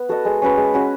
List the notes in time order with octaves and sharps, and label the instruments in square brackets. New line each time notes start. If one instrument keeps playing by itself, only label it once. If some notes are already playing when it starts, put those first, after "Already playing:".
Already playing: [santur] B3
F#4 A4 D#5
G#3
C#4 F#4 B4
G#3
C#4 F#4 B4